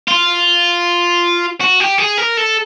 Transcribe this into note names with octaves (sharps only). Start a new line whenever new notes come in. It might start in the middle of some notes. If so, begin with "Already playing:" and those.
F4
F#4
G4
G#4
A#4
A4